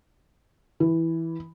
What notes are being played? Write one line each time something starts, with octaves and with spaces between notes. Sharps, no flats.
E3